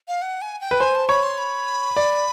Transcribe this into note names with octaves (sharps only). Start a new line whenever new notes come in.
F5
F#5
G#5
G5
B4
C5 G#5
A5
C#5 B5
C6
B5
D5